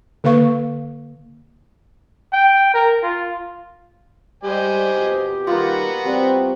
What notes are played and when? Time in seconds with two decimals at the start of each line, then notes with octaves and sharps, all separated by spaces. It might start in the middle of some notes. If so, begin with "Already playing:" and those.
0.24 D3 A#3 B4 F5 C#6
2.33 G5
2.74 A#4
3.03 F4
4.44 G3 G4 C5 D#5 G#5
4.96 F2 B2 F#4
5.47 D#3 G3 A#3 B3 F4 F#4
6.05 G3 C4